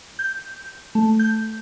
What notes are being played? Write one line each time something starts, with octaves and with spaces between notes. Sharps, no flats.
G6
A3
G6